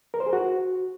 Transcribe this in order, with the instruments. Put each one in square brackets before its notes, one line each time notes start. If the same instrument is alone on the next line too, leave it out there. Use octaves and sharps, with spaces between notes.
[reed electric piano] A#4
C5
G#4
F#4